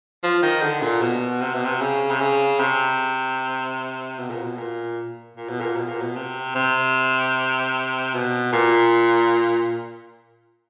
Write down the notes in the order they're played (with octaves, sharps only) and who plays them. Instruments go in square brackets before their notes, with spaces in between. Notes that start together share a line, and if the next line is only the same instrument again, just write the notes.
[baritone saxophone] F3
D#3
D3
A#2
B2
C3
B2
C3
C#3
C3
C#3
C3
B2
A#2
B2
A#2
A#2
B2
A#2
B2
A#2
B2
C3
C3
B2
A#2